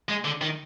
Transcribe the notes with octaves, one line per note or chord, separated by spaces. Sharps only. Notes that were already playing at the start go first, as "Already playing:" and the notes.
G#3
D3
D#3